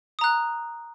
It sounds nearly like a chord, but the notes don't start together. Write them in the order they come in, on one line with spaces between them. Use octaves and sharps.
D#6 A#5 F#6